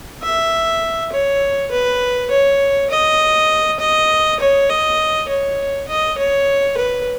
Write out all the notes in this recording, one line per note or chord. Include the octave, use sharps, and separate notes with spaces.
E5
C#5
B4
C#5
D#5
D#5
C#5
D#5
C#5
D#5
C#5
B4